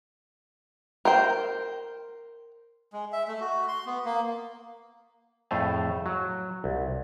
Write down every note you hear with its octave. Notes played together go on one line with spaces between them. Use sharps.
A#4 C5 G5
G#3
E5
A3
F#4
C6
B3
A#3
F2 A2 A3 G#4 C5 F5
F#3
C2